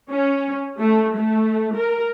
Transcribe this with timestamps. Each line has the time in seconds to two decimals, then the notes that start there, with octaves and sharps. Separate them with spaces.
0.10 C#4
0.79 A3
1.16 A3
1.75 A#4